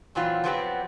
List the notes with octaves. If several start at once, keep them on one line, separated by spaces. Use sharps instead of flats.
A#2 E3 F#3 C4 F4
F3 F#3 B3 C4 E4 G4